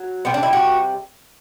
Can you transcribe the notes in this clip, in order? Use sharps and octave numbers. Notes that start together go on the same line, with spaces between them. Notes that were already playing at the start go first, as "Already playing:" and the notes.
Already playing: F#3
C3 G3 B3
D4
E4
F#4